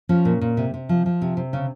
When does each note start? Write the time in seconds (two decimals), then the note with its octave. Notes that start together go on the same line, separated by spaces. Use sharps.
0.09 F3 C#4
0.25 A#2
0.41 A#2
0.57 C3
0.74 C3
0.89 F3
1.06 F3
1.22 C3
1.37 C3
1.53 C#3 C#4